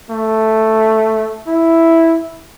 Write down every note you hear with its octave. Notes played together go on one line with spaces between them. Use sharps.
A3
E4